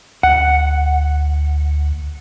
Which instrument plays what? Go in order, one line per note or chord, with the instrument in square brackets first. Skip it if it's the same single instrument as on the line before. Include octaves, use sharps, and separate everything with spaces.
[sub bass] D2 [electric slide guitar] F#5